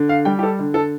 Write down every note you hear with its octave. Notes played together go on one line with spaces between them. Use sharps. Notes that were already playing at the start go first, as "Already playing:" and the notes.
Already playing: D3
F5
G3 G5
G4
A4
D3
A4